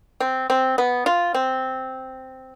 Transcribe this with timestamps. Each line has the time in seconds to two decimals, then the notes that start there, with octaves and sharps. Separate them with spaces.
0.20 C4
0.50 C4
0.78 B3
1.06 F4
1.34 C4